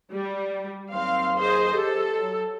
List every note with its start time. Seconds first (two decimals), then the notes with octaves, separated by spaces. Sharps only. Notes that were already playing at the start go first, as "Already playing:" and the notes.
0.12 G3
0.93 D#2 F#3 C4 F5 C6
1.37 G#4 C5 D#5
1.74 G4 A4
2.18 F#3